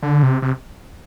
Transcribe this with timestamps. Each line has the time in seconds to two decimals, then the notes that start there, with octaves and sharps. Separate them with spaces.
0.03 D3
0.23 C3
0.42 C3